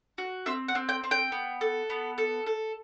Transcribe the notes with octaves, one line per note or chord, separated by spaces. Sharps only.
F#4
C4 E5
F#5
C4
G5
C4
G5
B3
A4
B3
A4
A4